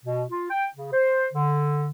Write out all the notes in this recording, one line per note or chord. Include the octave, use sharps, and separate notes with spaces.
B2
F4
G5
C#3
C5
D3